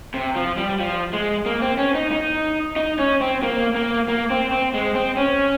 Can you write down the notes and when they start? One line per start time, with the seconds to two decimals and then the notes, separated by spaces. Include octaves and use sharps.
0.14 C3
0.35 F3
0.57 G3
0.80 F3
1.13 G#3
1.46 A#3
1.61 C4
1.78 C#4
1.95 D#4
2.11 D#4
2.76 D#4
2.99 C#4
3.21 C4
3.43 A#3
3.75 A#3
4.08 A#3
4.30 C4
4.52 C4
4.74 G#3
4.95 C4
5.17 C#4